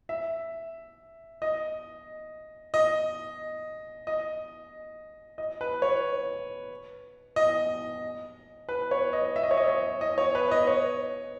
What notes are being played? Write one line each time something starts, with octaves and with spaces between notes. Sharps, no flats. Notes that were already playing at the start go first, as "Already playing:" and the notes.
E5
D#5
D#5
D#5
D#5
B4
C#5
D#5
B4
C#5
D#5
E5
D#5
C#5
D#5
C#5
D#5
C#5
B4
D#5
C#5